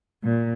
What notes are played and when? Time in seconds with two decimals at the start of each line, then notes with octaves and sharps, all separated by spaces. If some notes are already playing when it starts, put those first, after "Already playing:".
0.23 A#2